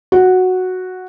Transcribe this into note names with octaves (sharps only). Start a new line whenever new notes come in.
F#4